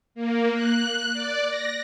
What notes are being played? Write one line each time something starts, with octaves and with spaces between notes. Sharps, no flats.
A#3
F#6
D5
A#6